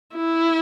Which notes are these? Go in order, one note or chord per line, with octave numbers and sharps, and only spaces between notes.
E4